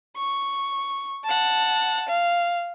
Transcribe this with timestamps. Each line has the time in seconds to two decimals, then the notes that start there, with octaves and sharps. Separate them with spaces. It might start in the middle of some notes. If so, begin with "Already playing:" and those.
0.17 C#6
1.24 F#5 A5
2.08 F5